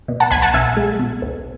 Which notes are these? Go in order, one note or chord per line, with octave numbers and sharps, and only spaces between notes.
B2
F#5 A5
B1 G#5 B5
F#5 A5
B1 E5 G#5
G#3
B2
B1